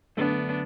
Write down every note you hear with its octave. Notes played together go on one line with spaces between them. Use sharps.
F#2 D3 A3 B3 D4